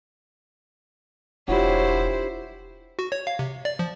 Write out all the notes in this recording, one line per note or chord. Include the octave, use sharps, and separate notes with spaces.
E1 F#3 D4 E4 F4 G4 C5
F#4
C#5
F5
C3
D5
F3